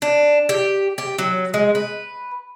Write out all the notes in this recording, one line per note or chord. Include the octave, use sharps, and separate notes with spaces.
D4
G4
G4
F#3
G#3
B4